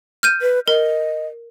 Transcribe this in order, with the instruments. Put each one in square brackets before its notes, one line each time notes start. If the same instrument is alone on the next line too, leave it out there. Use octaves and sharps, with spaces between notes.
[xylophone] F6 G6 D#7
[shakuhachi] B4
[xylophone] A#4 [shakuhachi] D#5